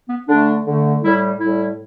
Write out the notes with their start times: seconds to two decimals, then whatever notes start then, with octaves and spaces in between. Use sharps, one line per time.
0.09 B3
0.28 D3 A3 D4
0.66 D3 A3
1.03 A2 G3 E4
1.39 A2 G3 E4